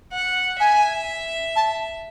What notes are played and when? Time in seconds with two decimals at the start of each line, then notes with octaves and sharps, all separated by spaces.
0.13 F#5
0.60 E5 G#5
1.56 A5